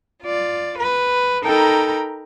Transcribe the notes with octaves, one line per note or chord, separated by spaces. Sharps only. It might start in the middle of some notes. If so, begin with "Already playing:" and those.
F4 D5
B4
D#4 A4 A#4 G5 A#5 B5